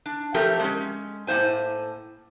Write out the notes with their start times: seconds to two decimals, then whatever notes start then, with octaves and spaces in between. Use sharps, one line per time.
0.06 D4
0.34 F3 A3 C4 G4 A#4
0.60 G#3 C#4
1.27 A2 A#3 C4 C5 G#5